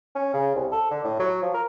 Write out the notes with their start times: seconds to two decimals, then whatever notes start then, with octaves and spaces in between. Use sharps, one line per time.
0.15 C#4
0.34 C#3
0.55 C2
0.72 A4
0.91 D3
1.04 A2
1.19 F#3
1.42 F3
1.54 A#4